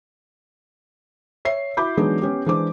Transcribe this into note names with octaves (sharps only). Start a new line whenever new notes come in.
C#5 E5 C7
E4 F#4 B5 D6 G6
E3 F#3 G#3 B3 D4 D#4
B3 C#4 G4
E3 G#3 D4 C5 D6